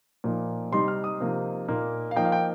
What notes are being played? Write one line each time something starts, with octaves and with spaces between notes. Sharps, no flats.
A#2 F3 A#3 D#4
C3 G3 D#4 C6
F6
D#6
C3 F3 A#3 D#4
A#2 A#3 D#4
F5
F3 A#3 D#4 G5
F5
G5